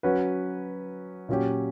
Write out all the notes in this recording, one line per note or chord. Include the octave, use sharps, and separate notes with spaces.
F#3 C#4 F#4 B4
A#2 F#3 C#4 G4